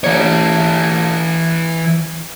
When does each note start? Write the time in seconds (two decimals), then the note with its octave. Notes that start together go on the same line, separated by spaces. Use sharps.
0.04 E3 C#5